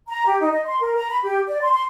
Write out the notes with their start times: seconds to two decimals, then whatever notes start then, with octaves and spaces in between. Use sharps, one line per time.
0.08 A#5
0.26 G4
0.40 D#4
0.52 D#5
0.66 C6
0.80 A#4
0.95 A#5
1.10 B5
1.23 G4
1.47 D5
1.62 C6
1.73 C6